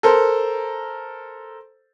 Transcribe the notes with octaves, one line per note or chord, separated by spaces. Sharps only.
A4 A#4 C5